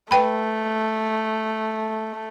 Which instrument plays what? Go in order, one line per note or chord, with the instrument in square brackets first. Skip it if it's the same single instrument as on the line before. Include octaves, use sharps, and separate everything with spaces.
[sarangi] A3 [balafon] B4 G5 B5